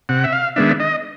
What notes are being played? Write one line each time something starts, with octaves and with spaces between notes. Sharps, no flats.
C3 F#5
E5
F5
D#3 G#3 B3 D4 E5
D#5